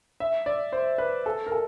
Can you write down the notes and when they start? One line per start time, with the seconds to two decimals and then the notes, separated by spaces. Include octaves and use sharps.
0.20 E5
0.46 D5
0.72 C5
0.98 B4
1.26 A4
1.47 A#4
1.52 A4